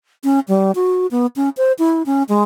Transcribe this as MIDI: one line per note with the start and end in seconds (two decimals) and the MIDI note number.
0.24 0.40 61
0.48 0.72 55
0.75 1.07 66
1.11 1.26 59
1.36 1.49 61
1.57 1.73 72
1.79 2.03 64
2.06 2.23 61
2.29 2.43 56